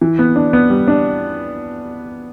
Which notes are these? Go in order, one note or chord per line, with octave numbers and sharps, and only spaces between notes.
E3
B3
D4
B3
G3
D4